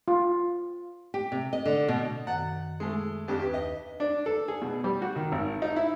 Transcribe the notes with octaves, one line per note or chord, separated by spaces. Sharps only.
F4
G4
C3
D#5
D3
B2
F#2 D#3 F#5
G#3 A3
F2 D4 G4
D#2 D4 G4 B4
D#5
D4
A4
G#4
B2
G3
F#4
D#3
G#1
D#4
E4